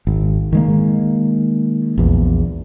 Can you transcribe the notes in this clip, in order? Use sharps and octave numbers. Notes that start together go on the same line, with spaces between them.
G#1
D#3 G#3 A#3
A#1 E2